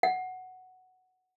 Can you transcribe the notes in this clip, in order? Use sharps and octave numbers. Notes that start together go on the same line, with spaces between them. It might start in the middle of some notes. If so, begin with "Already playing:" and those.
F#5